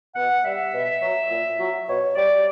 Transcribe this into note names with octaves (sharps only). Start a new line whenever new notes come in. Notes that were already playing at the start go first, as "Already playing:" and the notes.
B2 F#5
G3 E5
B2
F#3
A#2
F#3
B2 C#5
G3 D5